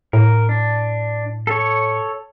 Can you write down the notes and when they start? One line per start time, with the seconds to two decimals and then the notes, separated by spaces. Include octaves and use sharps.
0.13 A2 A#4
0.49 D4
1.47 A4 C#5